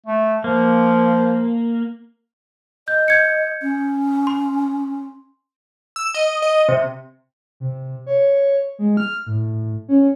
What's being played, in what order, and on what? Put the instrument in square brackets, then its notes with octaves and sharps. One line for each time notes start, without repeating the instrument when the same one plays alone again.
[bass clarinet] A3
[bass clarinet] F3 [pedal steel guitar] A#3
[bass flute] D#5 [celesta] G6
[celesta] G6 G#6 C#7
[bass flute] C#4
[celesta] C6
[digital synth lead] E6
D#5
D#5
C3
[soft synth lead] C3
C#5
G#3
F6
A2
C#4